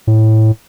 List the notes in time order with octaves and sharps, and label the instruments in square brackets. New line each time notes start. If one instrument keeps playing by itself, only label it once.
[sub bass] A2